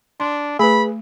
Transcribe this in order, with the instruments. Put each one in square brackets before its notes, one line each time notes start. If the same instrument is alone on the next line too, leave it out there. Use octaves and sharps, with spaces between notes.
[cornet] D4 [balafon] C6
[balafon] A3 [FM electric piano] G#4 B4 [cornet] B5